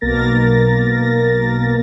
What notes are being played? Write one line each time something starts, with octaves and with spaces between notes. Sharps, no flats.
B1 B2 A#3 A#4 A6 A#6